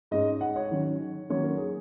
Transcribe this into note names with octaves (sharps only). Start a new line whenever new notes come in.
G#2 G#3 C#4 D#5
F#5
C#5
D#3 F#3 C#4
D#3 F#3 A#3 C#4 C#5
A#4
G#4